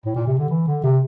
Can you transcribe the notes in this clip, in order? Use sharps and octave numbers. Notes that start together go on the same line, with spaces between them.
A2
A#2
C3
D3
E3
D3
C3